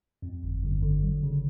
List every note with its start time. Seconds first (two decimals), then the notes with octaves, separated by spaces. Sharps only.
0.22 F2
0.43 G1
0.63 G1
0.82 D3
1.03 F#3
1.23 C#3